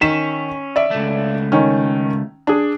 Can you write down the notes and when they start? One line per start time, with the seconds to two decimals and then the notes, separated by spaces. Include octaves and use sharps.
0.01 D#3 C#4 B6 E7
0.76 D5 E5
0.91 C#2 A3
1.52 D#3 C#4
2.47 D4 G#4